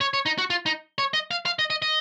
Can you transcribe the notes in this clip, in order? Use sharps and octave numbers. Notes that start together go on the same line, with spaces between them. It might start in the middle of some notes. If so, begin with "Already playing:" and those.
C#5
C#5
D#4
F#4
F4
D#4
C#5
D#5
F5
F5
D#5
D#5
D#5